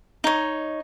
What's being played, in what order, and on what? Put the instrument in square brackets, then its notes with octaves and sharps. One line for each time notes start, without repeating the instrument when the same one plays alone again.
[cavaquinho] D#4 C#5